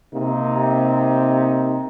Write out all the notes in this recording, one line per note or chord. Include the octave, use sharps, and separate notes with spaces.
C3 A#3 D#4